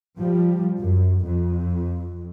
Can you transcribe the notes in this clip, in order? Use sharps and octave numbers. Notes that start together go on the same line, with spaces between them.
F3 G3
F#2
F2